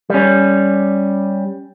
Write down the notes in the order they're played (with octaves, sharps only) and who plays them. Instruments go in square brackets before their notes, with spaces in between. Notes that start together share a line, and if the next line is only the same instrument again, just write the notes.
[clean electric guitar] G3 C#4